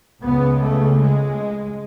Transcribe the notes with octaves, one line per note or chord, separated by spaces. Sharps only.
C#2 C#3 B3
A3
G#3